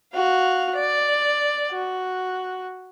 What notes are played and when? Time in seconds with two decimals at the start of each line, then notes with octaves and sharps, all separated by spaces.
0.13 F#4 F5
0.75 D5
1.71 F#4